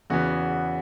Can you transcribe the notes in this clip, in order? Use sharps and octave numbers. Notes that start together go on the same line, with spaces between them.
E2 C#3 E3 B3 F#4